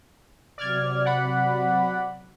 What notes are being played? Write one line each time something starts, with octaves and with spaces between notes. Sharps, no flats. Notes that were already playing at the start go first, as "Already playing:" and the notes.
C3 F#3 D5 F6 G#6
D5 F#5 B5